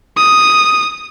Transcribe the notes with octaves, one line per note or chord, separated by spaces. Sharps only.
D#6